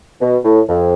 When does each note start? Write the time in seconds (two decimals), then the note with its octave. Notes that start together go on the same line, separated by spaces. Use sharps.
0.21 B2
0.44 A2
0.69 F2